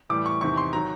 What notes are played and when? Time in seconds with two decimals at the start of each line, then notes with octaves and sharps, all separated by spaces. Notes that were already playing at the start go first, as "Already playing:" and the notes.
0.10 A2 E3 G3 D6
0.26 C#6
0.41 E2 C3 D#3 C#6
0.57 C6
0.73 D#3 F#3 A#5